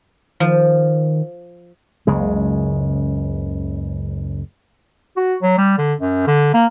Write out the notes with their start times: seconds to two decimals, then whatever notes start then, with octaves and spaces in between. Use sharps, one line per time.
0.40 D#3 F3
2.07 F#1 C#2 C#3 G#3
5.17 F#4
5.42 F#3
5.58 G3
5.78 D3
6.00 F#2
6.27 D3
6.54 A#3